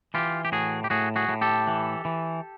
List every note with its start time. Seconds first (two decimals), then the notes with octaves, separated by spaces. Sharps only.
0.14 E3 F4 G4
0.45 G4
0.52 A2 F#4 G#4
0.84 G4
0.90 A2 F#4 G#4
1.16 F#4 G#4
1.29 A2
1.41 G4 A4
1.67 E3
2.05 E3